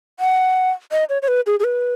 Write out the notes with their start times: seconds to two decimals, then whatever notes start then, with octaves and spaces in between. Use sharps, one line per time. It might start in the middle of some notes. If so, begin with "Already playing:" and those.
0.20 F#5
0.92 D#5
1.09 C#5
1.22 C#5
1.28 B4
1.47 G#4
1.60 G#4
1.64 B4